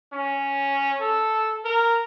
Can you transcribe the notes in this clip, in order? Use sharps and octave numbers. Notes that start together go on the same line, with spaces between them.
C#4
A4
A#4